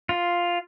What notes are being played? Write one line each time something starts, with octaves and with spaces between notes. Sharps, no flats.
F4